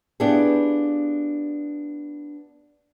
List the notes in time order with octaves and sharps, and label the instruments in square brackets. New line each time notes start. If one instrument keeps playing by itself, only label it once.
[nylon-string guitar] B3 D4 E4 F4 G4 G#4